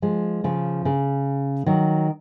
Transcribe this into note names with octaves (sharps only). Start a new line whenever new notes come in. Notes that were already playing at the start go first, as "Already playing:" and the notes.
F3 G#3
C#3 F3
C#3
D#3 F#3